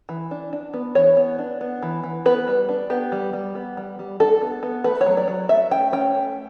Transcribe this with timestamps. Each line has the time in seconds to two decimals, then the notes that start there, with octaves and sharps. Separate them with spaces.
0.09 E3
0.31 D4
0.53 D4
0.74 B3
0.95 E3 C#5
1.17 B3
1.39 D4
1.61 B3
1.83 E3
2.03 E3
2.26 B3 B4
2.48 G3
2.69 D4
2.90 B3 G4
3.12 G3
3.33 G3
3.55 B3
3.77 G3
3.99 G3
4.20 D4 A4
4.42 B3
4.63 B3
4.84 A3 B4
5.01 C#5
5.06 F#3
5.17 D5
5.28 F#3
5.49 A3 E5
5.71 C#4 G5
5.93 C#4 G5
6.15 A3